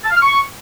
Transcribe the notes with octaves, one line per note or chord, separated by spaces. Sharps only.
A5
F5
F6
C#6